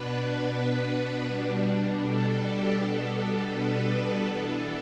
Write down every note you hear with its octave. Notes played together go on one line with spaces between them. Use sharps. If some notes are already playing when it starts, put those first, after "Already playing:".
Already playing: B2 B3 D4 B4
B4
B2 G3 D4
A4
G4
B2 G3 B3 D4 A4
B4
E3 B3 D4 A4